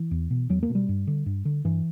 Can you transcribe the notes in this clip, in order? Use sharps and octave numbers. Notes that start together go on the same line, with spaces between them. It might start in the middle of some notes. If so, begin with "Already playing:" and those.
Already playing: E3
E2
B2
E2 F#3
A#3
B2
G3
G2
D3
G2
D3
G2 E3